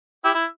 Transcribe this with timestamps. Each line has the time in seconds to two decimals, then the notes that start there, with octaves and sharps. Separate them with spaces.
0.25 E4 G4
0.35 E4